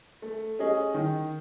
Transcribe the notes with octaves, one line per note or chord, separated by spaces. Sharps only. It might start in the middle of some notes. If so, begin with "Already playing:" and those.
A3
C#4 G#4 D#5
D#3